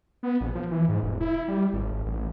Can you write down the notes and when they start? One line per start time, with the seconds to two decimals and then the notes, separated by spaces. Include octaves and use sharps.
0.23 B3
0.41 A#1
0.55 F3
0.71 E3
0.89 G#2
1.03 E1
1.20 E4
1.48 G3
1.73 G#1
1.93 G#1
2.06 A1